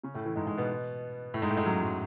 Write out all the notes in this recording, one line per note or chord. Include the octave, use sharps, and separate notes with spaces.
C#3 C#4
A2 A3
E3
G#2 G#3
G#2 G#3
B2 B3
A2 A3
G#2 G#3
A2 A3
G#2 G#3
F#2 F#3
F#3